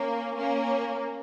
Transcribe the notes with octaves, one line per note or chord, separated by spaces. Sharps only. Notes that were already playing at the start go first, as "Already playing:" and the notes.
Already playing: A#3 C#4
A#3 C#4